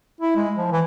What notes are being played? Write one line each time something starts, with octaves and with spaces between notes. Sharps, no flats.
E4
G#3
F3
E3